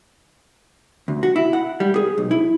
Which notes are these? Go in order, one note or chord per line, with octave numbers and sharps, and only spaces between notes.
D2
F#4
E4
F#5
G3
G#4
B1
E4